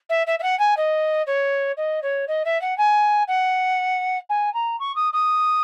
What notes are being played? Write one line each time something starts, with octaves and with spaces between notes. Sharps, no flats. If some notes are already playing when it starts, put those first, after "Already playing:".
E5
E5
E5
F#5
G#5
D#5
C#5
D#5
C#5
D#5
E5
F#5
G#5
F#5
G#5
A#5
C#6
D#6
D#6